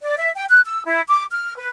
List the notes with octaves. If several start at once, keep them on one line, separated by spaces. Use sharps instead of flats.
D5
E5
G5
F#6
E6
E4
D6
F6
B4